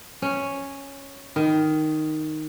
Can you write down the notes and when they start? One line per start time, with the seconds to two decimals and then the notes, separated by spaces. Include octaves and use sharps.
0.22 C#4
1.36 D#3